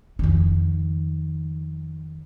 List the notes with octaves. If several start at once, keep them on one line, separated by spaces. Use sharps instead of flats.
F2 D#3